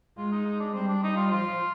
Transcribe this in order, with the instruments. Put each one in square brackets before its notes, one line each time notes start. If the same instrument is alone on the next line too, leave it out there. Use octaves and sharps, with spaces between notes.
[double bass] G#3 [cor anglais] F4
[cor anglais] D#4
D#4
D4
[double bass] G3 [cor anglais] C4
[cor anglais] D4
[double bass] G3 [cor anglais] D#4
[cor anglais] F4
[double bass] F3 [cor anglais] F4